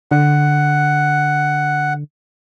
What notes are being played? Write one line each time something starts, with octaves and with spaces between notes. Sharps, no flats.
D3 F#5